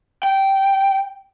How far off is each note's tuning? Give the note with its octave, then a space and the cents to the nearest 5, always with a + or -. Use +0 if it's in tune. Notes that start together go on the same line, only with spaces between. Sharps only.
G5 -10